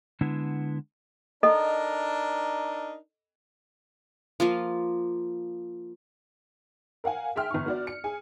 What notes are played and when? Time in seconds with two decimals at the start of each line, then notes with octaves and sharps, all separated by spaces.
0.21 D3 G#3 B3 D4 E4
1.43 D4 D#4 A4 A#4 D#5
4.40 F3 A#3 F4
7.04 A#4 F5 F#5 G#5
7.36 G#4 E5 G5 C6 F6
7.51 G1 C#6
7.66 B3 F#4 D5
7.87 C#7
8.04 G#4 G#5